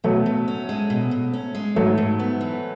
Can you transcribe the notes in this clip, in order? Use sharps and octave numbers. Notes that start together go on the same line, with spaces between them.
B2 F#3 A3
B2
C#4
G#3
B2
B2
C#4
G#3
G#2 F#3 A3
G#2
B3
E3